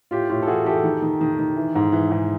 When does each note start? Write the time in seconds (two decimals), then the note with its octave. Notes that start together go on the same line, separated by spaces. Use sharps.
0.11 A2 F4 G4
0.29 A2 F4 G4
0.42 A4
0.47 E3 F#4 G#4
0.65 E3 G4 A4
0.83 D#3
1.02 D#3
1.21 D#3
1.39 D#3
1.56 E3
1.75 G#2
1.92 E3
2.11 G#2